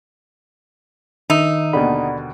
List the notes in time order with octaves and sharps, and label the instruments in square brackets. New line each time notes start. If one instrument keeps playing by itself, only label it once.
[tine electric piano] D#3 E5 E6 [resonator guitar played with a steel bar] D#4
[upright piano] D#2 B2 D3 [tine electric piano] D5 F#5 B5